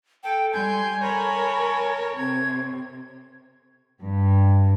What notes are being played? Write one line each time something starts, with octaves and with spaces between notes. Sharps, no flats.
A4 G5
G3 G#5 C6 G6
A4 A#4 C#5 B5
C3 G#6
G2